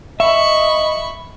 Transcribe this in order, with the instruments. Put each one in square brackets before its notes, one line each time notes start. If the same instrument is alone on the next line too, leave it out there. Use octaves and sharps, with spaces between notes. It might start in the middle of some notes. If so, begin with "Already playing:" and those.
[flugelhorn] D#5 [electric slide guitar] E5 [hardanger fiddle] B5 C#6